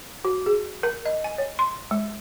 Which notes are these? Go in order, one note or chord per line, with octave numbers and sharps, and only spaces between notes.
F#4
G#4
A#4
D#5
G#5
C#5
C6
G#3